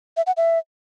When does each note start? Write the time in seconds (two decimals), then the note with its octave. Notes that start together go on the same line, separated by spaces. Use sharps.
0.17 E5
0.27 F#5
0.37 E5